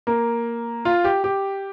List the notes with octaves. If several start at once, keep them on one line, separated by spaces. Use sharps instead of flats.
A#3
F4
G4
G4